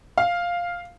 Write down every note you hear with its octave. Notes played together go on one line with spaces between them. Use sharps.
F5